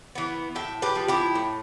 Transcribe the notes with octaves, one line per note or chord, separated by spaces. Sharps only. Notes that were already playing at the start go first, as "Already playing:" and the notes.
E3 B3
A2 E5 G5
G4 B4
F3 B3
E4 G4
A2